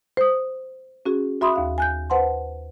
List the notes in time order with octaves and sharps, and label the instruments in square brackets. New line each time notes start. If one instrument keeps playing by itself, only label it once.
[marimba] C5 D#6
C#4 F#4 G#4
F#4 E5 B5 C6 D#6
D#2 F5 F#6
G#5 F#6 G6
B4 C5 F#5 A5 C6